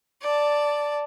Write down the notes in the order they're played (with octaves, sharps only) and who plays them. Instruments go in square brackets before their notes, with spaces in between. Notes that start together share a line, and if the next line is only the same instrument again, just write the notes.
[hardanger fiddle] D5 A5